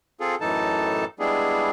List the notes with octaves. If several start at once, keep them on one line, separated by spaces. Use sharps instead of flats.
C4 F4 G#4 A4
F#2 A2 E3 D#4 A4 A5
G3 G#3 B3 D4 E4 G#4